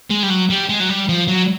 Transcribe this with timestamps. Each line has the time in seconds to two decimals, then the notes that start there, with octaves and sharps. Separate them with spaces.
0.11 G#3
0.23 G3
0.30 F#3
0.50 G3
0.69 G#3
0.80 F#3
0.89 G3
1.09 F3
1.28 F#3